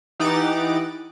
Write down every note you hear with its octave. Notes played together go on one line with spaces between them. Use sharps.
E3 D#4 G4 F#5 D6 A6